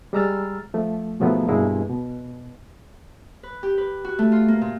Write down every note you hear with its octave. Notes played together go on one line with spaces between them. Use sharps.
G3 G#3 A#5 E6 F6 A6
F3 A3
G#2 B2 F3 F#3 A3 B3
G2 B2 G#3 A#3 E4
B2
B4
G4
B4
F#4
A3
F4
A#3
A#2